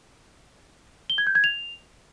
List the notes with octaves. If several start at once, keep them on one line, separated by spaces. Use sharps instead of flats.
G7
G#6
G6
G#6
F7